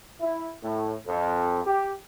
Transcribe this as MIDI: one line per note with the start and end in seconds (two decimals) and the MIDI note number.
0.20 0.50 64
0.62 0.94 45
1.07 1.60 41
1.65 1.91 67